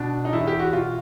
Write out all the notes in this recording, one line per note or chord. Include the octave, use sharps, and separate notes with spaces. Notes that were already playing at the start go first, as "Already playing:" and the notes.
Already playing: B2 D4
D#4
E2 E4
G4
F#4
B2 F4